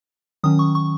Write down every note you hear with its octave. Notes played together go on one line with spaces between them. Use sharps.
D#3 F#3 C#4 D#6
C#6
C#6